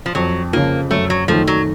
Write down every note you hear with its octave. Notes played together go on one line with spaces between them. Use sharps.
F3
F2 F#3
C#3 F3 A#3
F#2 A3
F#3
D#3 F3 A3
F#3